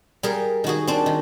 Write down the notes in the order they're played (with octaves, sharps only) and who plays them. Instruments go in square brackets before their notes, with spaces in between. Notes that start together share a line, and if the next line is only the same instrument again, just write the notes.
[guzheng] G3 G#4 A#4
D#3 F#4 G#4
C4 D4
D#3